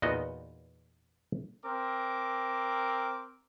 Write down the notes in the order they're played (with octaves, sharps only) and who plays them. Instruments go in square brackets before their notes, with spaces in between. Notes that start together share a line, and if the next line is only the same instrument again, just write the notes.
[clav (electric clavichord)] E2 A#2 B3 D#4 F#4 D#5
[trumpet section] C4 A#4 D6